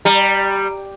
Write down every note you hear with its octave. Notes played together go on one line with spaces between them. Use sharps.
G3 A#5 D#7